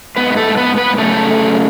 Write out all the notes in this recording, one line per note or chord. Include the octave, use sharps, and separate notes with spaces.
G#2 B3 B4
B4
A3 A4
A4
B3 B4
B3 B4
F#2 C#3 A3 A4